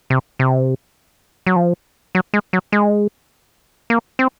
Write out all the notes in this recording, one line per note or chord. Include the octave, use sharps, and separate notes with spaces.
C3
C3
F#3
F3
F#3
G#3
F#3
G#3
A#3
C4